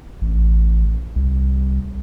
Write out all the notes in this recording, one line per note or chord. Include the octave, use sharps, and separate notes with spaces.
A1
C2